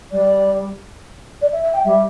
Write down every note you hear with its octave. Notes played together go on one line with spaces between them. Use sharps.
G3 D5
D5
E5
E5
G5
G3 E5